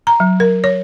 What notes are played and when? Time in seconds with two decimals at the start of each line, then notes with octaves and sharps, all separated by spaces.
0.07 A#5
0.20 F#3
0.40 A#4
0.64 C#5